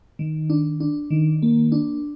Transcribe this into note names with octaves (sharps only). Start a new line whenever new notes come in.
D#3
D4
D4
D#3
A#3
D4